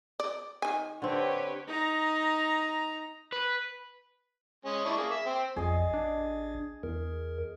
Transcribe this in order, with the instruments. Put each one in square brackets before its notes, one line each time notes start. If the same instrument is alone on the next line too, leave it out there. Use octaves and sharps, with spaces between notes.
[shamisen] D5
D#3 G#5
[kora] D3 C4 [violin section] G4 B4 C#5
[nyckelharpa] D#4 A#5
[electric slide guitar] B4
[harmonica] G#3 C#4
D4 E4 C#6
A#3 G#4
E5
C4
[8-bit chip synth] A1 [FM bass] F2 [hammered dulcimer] G#4 D#5
[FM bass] D4
[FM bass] E2 [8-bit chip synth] A#4